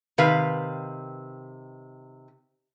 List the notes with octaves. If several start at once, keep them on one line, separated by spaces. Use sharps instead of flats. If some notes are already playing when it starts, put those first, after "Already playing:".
C3 D#3 B4 F5